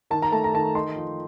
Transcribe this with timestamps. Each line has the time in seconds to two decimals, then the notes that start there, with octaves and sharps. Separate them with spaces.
0.11 D#3 A5
0.22 A#5
0.32 A3 A5
0.44 A#5
0.54 D#3 A5
0.75 D#4 C6
0.96 F3